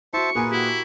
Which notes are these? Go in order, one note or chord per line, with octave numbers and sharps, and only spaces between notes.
E4 F#4 C5 E5 A5 C#6
A#2 G#4 A#4 B4 G#5 C#7
E4 F#4 G4